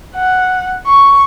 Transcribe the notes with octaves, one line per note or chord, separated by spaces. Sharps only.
F#5
C#6